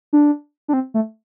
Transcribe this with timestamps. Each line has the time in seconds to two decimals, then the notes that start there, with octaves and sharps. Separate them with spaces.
0.13 D4
0.68 D4
0.73 C4
0.94 A3